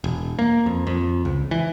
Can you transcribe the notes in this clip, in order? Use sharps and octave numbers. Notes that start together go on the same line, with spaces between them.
E1
A#3
F2
F2
C#2
E3